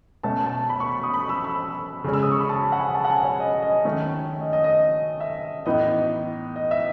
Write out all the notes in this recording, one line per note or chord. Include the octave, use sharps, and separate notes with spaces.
B2 A3 C#4 A5
A5
B5
C#6
D#6
B5
E6
E6
C#3 G#3 C#4
E6
D#6
C#6
B5
A5
F#5
G#5
A5
F#5
G#5
C#5
D#5
D#5
D#3 A3 C#4
D#5
D#5
D#5
E5
A2 E3 B3 D#4 D#5
D#5
E5